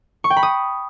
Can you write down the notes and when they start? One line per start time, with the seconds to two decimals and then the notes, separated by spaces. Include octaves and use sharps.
0.24 C#6
0.30 G5
0.37 B5
0.43 D#6